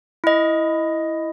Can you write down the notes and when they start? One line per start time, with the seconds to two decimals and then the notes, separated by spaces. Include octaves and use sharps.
0.24 E4 D#5